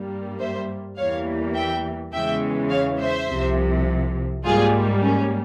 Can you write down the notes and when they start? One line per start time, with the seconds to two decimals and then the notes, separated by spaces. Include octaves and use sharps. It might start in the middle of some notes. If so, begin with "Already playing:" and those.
Already playing: G2 G3 A#3
0.39 C5 E5
0.97 E2 E3 G3 A#3 C#5 F5
1.54 E5 G5
2.12 E2 C#3 E3 G#3 E5 G5
2.70 C#5 F5
3.00 C5 E5
3.28 C2 C3 F3
4.44 G#2 G3 A#3 F4 G#4
5.03 C#4